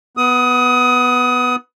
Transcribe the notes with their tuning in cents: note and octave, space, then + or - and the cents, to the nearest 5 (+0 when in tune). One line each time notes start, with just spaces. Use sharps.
B3 +0 D#6 +20